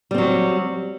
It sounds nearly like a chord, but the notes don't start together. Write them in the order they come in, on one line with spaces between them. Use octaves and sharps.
G3 C4 F#3